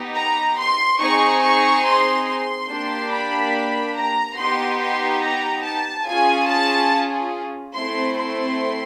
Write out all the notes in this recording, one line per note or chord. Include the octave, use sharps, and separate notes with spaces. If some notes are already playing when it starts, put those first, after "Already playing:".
Already playing: B3 D#4 G4
A#5
C6
C4 D#4 G#4 C#6
C#6
C6
C6
A#3 D4 G4
B5
A#5
B3 D#4 G4 C6
C6
A#5
A5
C#4 F4 G#4 G#5
A5
A3 C4 E4 C6
C6